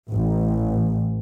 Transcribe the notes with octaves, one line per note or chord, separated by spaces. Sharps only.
A1